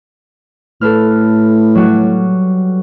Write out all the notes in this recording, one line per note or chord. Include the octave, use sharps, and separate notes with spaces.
A2 A4 B4 F6
F#3 G3 F#4